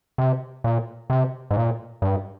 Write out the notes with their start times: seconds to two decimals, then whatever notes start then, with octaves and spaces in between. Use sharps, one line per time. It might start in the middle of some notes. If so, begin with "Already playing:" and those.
0.18 C3
0.64 A#2
1.10 C3
1.51 G#2
1.56 A#2
2.02 G2